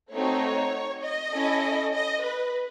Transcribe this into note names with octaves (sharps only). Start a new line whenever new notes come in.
A3 C4 D#4 F#4 C#5
D#5
C#4 E4 A4
D#5
B4